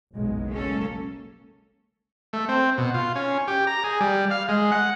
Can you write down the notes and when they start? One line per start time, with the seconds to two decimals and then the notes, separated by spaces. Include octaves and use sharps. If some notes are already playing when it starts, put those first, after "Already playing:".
0.12 F#1 B1 G#3
0.49 A#3 C#4 A4
2.33 A3
2.48 C4
2.78 B2
2.94 F4
3.16 C#4
3.48 G4
3.67 A#5
3.84 G#4
4.00 G3
4.31 F5
4.49 G#3
4.72 F#5